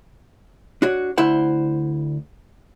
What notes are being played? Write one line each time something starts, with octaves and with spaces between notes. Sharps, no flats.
D4 F#4 C#5
D2 E4 C5 F#5